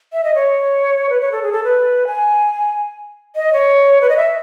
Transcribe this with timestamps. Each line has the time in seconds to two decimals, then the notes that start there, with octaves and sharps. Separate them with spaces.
0.13 E5
0.24 D#5
0.35 C#5
1.10 B4
1.21 C#5
1.32 A4
1.43 G#4
1.52 A4
1.64 B4
2.07 G#5
3.36 D#5
3.53 C#5
4.01 B4
4.09 D#5
4.17 E5